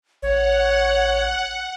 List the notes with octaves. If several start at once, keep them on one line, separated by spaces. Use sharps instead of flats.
A1 C#5 F#5